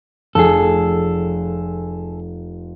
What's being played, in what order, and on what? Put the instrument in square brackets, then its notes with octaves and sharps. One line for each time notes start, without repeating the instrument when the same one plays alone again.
[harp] F1 [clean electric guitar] G#4 A4